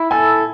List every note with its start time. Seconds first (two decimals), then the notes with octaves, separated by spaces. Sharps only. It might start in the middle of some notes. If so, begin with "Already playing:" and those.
Already playing: E4
0.11 A4 G#5